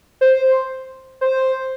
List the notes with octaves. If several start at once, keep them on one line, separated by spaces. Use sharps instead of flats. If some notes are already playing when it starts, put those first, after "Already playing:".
C5
C5